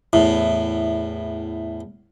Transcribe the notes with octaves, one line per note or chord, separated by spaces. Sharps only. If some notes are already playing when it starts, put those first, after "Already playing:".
E2 A2